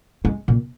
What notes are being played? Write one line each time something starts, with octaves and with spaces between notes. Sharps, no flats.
G#3
A#2